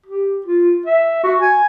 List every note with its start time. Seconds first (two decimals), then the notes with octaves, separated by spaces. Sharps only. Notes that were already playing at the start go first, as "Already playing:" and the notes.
0.06 G4
0.46 F4
0.86 E5
1.23 F#4
1.40 G#5